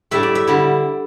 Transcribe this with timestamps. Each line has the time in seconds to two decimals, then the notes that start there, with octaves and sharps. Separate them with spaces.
0.11 A2 G3 D4 E5
0.23 D5
0.35 E5
0.47 D3 G3 E4